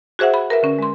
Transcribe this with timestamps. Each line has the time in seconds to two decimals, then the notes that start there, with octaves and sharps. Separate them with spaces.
0.19 F#4 G#4 C5 E5 F#5
0.34 B5
0.50 A#4 B4 E5
0.63 D3 C#4
0.79 G#3 C6